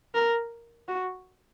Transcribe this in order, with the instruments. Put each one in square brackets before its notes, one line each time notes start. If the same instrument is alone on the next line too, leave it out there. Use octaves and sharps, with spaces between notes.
[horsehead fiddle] A#4
F#4